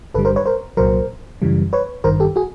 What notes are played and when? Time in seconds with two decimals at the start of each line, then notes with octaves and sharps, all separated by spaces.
0.14 G1 G2 D3 G3 A4 B4
0.25 A#4 C5
0.36 B4 C#5
0.46 A#4 C5
0.77 C2 A#2 F#3 A#4 C5
1.42 F#2 C#3 E3 G3
1.73 B4 C#5
2.04 G#1 G2 D#3 A#4 C5
2.20 G4 A4
2.36 F#4 G#4